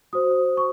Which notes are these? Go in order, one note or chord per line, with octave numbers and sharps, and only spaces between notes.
F#4 C5 D#6
C#6